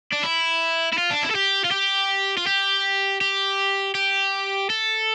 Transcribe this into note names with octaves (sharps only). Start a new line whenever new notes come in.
D4
E4
E4
F4
D4
E4
A4
G4
F4
G4
F4
G4
G4
G4
A4